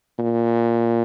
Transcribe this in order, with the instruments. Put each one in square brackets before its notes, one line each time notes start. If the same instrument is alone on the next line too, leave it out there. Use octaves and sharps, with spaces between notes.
[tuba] A#2